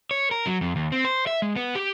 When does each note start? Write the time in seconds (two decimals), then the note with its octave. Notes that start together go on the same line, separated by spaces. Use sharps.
0.11 C#5
0.31 A#4
0.47 F#3
0.61 F2
0.76 D#2
0.92 C4
1.05 C5
1.27 E5
1.42 G#3
1.56 B3
1.75 G4